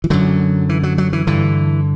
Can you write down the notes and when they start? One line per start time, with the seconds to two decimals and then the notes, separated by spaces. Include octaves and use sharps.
0.04 E3
0.10 F#2 D3 F#3
0.69 E3
0.83 F#3
0.98 F#3
1.13 E3
1.27 G2 D3 E3